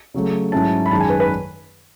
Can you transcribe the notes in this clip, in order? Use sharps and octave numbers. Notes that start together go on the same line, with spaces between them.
C#3 F#3 A3
G#2 F#3 C#4 E4 A5
B5
F#2 D#3 G#3 A5
G#5
B4
B4